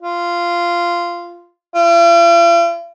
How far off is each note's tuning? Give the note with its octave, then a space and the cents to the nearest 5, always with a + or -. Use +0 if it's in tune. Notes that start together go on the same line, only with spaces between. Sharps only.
F4 -10
F4 -45